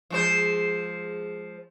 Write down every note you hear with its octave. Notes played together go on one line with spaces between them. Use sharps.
F3 G#3 C5